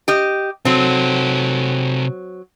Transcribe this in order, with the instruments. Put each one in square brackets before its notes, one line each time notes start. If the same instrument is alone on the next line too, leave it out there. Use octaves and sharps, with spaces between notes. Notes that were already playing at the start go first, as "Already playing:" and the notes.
[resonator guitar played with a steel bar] G4 D#5
[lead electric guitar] C3 A4 [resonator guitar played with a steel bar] F#3 C4